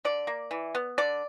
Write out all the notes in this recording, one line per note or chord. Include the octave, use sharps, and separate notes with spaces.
D3 D5
A#3
E3
B3
D3 D5